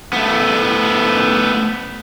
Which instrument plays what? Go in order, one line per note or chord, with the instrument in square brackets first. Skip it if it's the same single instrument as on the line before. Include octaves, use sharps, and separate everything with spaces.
[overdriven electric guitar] A3 B3